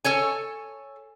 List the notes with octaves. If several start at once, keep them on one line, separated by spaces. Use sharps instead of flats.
A4 C#5 G#5